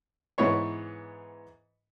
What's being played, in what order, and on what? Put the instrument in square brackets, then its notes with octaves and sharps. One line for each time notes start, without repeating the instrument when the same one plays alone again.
[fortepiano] G#2 E3 B3 C#5 C#6